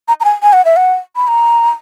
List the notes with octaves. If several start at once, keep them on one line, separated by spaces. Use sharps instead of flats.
A#5
A#5
G#5
G#5
F#5
E5
F#5
B5
A#5